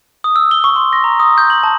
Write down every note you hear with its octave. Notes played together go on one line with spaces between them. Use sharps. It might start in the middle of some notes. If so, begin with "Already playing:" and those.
D#6
E6
G7
C#6
C6
A#6
A#5
D#6
G6
F#7
A5